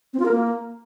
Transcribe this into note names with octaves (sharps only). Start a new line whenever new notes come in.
C4
F4
A#4
A#3